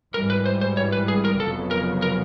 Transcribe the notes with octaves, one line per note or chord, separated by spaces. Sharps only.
G#1 G#2 E3 G3 A#4
B4
C5
C5
C#5
B4
G#4
A#4
F1 F2 C#3 F#3 B3 A4
A#4
A#4